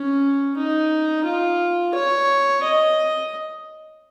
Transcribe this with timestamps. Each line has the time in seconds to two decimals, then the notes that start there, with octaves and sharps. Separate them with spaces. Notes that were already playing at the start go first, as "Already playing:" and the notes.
Already playing: C#4
0.57 D#4
1.25 F4
1.94 C#5
2.63 D#5